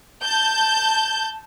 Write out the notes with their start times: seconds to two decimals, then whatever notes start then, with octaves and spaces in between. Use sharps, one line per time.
0.23 A5 G6